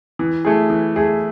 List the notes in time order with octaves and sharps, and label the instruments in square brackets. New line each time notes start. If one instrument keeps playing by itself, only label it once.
[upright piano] E3
A3 E4 G#4
E3
A3 E4 G#4